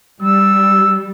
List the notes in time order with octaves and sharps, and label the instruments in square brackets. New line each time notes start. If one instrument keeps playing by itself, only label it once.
[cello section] G3 [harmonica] E6